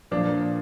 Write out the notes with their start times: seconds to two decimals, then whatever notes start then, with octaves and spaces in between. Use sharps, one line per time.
0.11 A#2 F3 D4